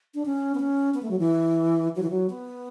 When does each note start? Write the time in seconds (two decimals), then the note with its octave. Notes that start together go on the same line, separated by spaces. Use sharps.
0.14 D4
0.26 C#4
0.55 B3
0.60 C#4
0.94 B3
1.02 A3
1.11 F#3
1.19 E3
1.96 F#3
2.02 E3
2.10 F#3
2.30 B3